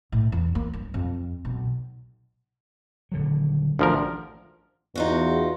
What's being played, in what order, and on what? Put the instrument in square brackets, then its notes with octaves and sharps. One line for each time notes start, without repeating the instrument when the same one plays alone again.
[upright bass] A2
E2
A#3
G2
F2
B1
[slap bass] D#1 D3 F#3
[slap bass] A1 D4 [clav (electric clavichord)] D2 F3 A#4
[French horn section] E2 [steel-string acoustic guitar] D#4 F4 F#4